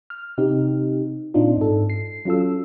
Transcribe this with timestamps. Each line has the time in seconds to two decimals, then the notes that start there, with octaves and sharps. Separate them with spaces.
0.10 F6
0.38 C3 C4 D#4 G4
1.34 A#2 C4 D4 D#4 F4
1.57 G#2 A4
1.90 C7
2.25 F#3 C#4 F4 A4 E6